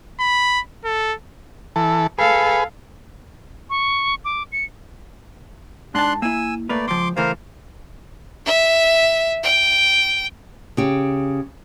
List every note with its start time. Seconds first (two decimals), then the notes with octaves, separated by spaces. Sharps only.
0.20 B5
0.85 A4
1.76 E3 A4
2.18 G#4 A4 B4 F5
3.70 C#6
4.25 D6
4.52 C#7
5.95 G#2 D4 A5 C6 F#6
6.22 A#3 E4 G#5 E6
6.69 A3 A#3 A#4 B4 D5
6.87 C#2 F3 C6 D6
7.16 C#3 E3 A3 A#4 C5 F5
8.46 E5
9.43 G5
10.77 C#3 G4